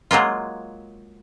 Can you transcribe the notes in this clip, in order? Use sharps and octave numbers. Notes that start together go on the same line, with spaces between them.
F#3 G#3 A#3 F4